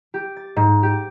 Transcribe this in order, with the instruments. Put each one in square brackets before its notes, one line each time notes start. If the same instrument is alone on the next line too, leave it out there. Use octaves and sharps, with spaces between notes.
[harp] G4
A6
G#2
G4